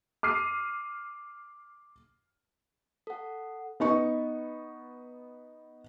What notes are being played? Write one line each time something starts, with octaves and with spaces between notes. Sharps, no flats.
D6 F6 C7 D#7
A4 F#5
B3 D#4 C#6